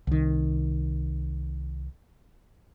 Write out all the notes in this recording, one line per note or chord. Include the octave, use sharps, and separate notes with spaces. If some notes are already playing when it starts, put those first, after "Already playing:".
C2 D#3